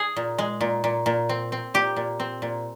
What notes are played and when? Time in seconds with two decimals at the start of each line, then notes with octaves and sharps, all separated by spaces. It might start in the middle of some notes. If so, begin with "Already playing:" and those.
Already playing: G#4
0.16 A#2
0.39 G#3
0.61 A#2
0.84 A#2
1.06 A#2
1.29 C4
1.52 C4
1.74 A#2 G4
1.96 A#2
2.20 C4
2.42 A#2